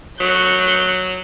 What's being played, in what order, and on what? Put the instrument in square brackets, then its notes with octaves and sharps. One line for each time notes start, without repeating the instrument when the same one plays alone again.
[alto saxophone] F#3 [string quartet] C#6 F#6 G6